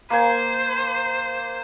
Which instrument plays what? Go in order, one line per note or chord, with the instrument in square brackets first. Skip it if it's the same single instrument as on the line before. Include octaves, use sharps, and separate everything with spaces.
[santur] A#3 G#5 [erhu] C5